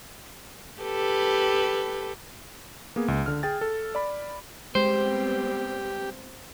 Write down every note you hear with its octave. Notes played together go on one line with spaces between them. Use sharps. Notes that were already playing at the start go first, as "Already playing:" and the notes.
G4 A4 B4
A#3 B3 G#4
C#2
D3 F6
G#4 G5 A6
A4
D5 B5
G3 G#3 B3 C4 G4 C5